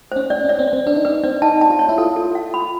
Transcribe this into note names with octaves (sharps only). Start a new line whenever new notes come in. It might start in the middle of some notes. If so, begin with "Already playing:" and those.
C#4 C5
C#4 D5
C#4
D5
C4
D5
C4
D4 B4
D#4
D4 B4
C4 D5
D#4 A5
A5
F4
C#5
E4
F4 A4
A4
F5
B5